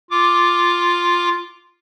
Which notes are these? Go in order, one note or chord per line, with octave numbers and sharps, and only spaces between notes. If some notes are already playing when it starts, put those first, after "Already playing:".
F4 D6